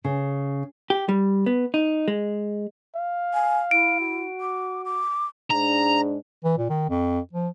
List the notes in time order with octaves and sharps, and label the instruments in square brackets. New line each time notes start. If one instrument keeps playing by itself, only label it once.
[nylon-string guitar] C#3
[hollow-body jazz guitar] G4
G3
B3
D#4
G#3
[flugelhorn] F5
[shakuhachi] G#5
[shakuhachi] E4 [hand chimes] D7
[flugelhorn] F#4
[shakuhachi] D6
D6
[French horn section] G#2 D4 [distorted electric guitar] A#5
[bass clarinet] E3
A#2
D#3
F2
F3